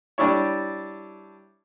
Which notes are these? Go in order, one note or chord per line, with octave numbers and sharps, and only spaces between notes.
G3 D4 E4 C#5